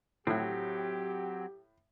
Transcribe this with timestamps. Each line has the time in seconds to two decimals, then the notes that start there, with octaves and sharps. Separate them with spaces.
0.27 A2 F#3 C4 G4